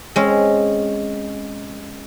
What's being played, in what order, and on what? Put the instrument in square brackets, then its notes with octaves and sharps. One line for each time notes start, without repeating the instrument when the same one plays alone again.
[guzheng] G#3 C4 C#4